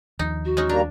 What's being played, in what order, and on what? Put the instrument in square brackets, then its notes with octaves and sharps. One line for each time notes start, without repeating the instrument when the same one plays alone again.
[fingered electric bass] D#2 F3 [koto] D#4
[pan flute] F#4
[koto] G#3 C#4 D#4
[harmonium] G3 A#3 A#5 [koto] D4